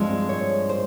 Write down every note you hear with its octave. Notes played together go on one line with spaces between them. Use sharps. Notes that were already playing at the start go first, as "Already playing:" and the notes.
Already playing: G2 F3 G#3 C4
C#5
C5